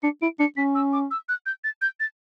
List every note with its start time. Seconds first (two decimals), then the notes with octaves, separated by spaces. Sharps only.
0.03 D4 C#7
0.22 E4 D7
0.39 D4 C#7
0.57 C#4 B6
0.75 E6
0.93 D6
1.11 E6
1.29 F#6
1.46 G6
1.64 A6
1.82 G6
2.00 A6